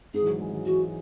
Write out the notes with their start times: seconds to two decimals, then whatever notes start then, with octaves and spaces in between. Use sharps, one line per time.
0.14 G#2 G#4
0.22 E3
0.26 F#3
0.40 G#3
0.53 F#3
0.66 E3 F#4